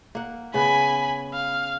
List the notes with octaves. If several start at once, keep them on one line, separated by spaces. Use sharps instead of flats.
A#3 F#5
C#3 B3 G#5 B5
F5